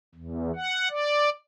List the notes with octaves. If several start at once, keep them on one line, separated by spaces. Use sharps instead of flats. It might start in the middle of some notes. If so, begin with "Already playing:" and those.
E2
F#5
D5